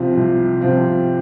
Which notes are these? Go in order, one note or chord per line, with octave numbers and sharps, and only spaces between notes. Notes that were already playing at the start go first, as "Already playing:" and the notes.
Already playing: C2 C3 F3 C4 F4
C2
C3 F3 C4 F4